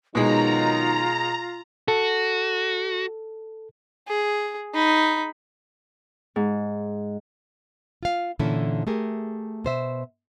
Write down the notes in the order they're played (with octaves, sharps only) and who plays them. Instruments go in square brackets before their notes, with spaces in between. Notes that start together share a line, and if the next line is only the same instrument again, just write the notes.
[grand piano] B2 G#3 [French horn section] D#3 F#3 D#4 [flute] F4 [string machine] A#5
[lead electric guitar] F#4 [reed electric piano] A4
[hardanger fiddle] G#4
D#4 B5
[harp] G#2
[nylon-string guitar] F4 F5
A#2 D3 E3 C#4 E4 A4
A3 G4 G#4 A#4
B2 C5 E5